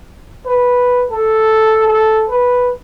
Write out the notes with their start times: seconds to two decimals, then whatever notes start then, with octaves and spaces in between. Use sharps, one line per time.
0.46 B4
1.11 A4
1.88 A4
2.29 B4